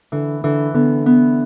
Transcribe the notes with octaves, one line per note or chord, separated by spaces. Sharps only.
D3 E3
D3 E3
D3 B3
B3